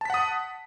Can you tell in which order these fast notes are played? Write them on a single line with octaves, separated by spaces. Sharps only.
A5 B6 F#5 D#6